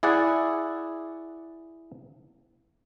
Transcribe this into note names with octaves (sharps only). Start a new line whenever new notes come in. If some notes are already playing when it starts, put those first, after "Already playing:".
E4 G#4 D5 F#5